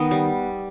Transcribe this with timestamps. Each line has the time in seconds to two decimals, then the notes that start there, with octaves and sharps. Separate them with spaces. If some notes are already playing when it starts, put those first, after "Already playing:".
Already playing: D#3 B3 D#5
0.11 G3